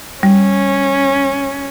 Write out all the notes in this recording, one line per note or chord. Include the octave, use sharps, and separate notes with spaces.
G3 C#4